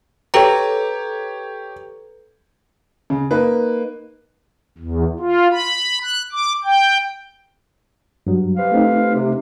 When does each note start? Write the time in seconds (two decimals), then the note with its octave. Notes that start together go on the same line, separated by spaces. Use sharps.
0.34 G4 A4 B4 C#5 A#5
3.10 C#3
3.31 A#3 D#4 B4
4.78 E2
5.19 F4
5.50 B5
6.02 F#6
6.32 D6
6.64 G5
8.27 G2 F#3
8.57 C3 B4 F5
8.72 A3 C4 D#4
9.14 C3